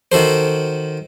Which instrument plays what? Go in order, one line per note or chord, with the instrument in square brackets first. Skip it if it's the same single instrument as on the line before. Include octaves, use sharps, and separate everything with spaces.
[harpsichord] D#3 F#4 A4 C5